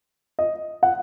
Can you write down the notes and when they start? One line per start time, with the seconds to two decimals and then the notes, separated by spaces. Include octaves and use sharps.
0.39 D#5
0.83 F#5